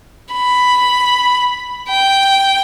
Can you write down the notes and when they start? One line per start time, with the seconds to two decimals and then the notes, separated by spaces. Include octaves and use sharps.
0.34 B5
1.90 G5